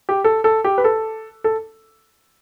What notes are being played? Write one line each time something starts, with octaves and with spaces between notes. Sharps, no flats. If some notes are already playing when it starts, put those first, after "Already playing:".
G4
A4
A4
G4
B4
A4
A4